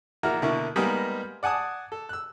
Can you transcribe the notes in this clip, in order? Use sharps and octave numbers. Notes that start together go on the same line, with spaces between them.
A#1 A#3 E4 F#4 A#5 F6
B2 D3 A#3 E4 C#6
G3 G#3 A#3 B3 D#4
D5 F#5 G#5 A5 D#6
A4
E6 F#6